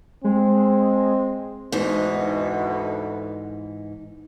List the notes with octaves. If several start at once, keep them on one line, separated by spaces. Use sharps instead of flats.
G#3 C4
D2 G#2 B2 E3 D#4